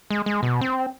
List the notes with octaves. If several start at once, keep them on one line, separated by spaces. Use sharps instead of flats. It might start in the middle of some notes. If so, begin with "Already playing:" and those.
G#3
G#3
B2
C4